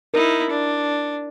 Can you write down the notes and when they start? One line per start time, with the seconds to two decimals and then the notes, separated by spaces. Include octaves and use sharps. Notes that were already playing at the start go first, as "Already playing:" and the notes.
0.14 D#4 E4 A#4
0.50 D4